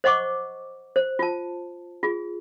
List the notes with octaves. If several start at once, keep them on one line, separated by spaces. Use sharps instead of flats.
C5 D#5 F#5 C#6 D6
C5
F4 A5
F4 G#4